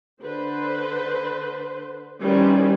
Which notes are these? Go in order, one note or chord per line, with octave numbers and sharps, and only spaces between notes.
D3 B4 C5
D#3 E3 G3 C#4 B4 C5